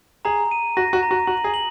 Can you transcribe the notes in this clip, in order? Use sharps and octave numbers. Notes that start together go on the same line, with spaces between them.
G#4 A#5
D#7
F#4 A#6
F#4
A#5
F#4
F#4 F#7
G#4
F#7